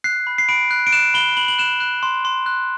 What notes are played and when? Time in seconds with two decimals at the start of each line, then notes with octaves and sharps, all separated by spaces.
0.04 F#6 C7
0.27 B5
0.38 C7
0.49 B5 D7
0.71 F#6
0.87 D7
0.92 F#6 E7
1.14 B5 G7
1.37 B5 F#7
1.48 F#7
1.59 F#6 E7
1.80 F#6
2.03 C6
2.25 C6
2.46 F#6